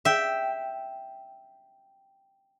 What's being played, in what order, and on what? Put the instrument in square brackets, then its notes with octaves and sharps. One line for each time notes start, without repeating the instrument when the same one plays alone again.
[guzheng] E5 G5